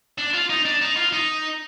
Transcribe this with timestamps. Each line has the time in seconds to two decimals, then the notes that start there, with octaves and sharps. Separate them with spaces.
0.18 D4
0.34 F4
0.50 D#4
0.65 D4
0.81 D#4
0.97 F4
1.13 D#4